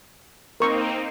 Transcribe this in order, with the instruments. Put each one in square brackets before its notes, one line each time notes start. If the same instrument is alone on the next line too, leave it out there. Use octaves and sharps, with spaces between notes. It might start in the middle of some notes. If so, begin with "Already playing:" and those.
[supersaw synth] A#3 C4 D#4 [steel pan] A#4 C#6